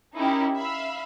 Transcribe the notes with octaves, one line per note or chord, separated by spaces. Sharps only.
C#4 D#4 E4 G4 A#4
E5 F5 B5